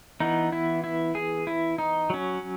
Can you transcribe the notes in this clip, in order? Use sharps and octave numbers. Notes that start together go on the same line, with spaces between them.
E3 B3 D#4
E4
E4
G#4
E4
D#4
F#3 C#4